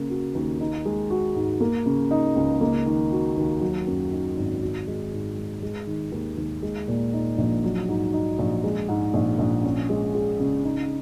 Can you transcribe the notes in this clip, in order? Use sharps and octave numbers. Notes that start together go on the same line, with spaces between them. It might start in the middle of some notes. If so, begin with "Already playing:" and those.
Already playing: C#3 A#3
F#4
D#2
D#4
G#3
F#4
G#2
A#3
C#3
D#4
C#2
A#3
D#3
F#4
D#2
F#3
F#2
D#4
G#1
F#4
G#3
G#2
G#2
G#3
D#3
D#2
D#2
G#3
A#2
D#4
A#1
F#3
G#2
D#4
A#1
G#3
G#2
A#1
A#1
C#4
G#3
G#4
C#3
D#4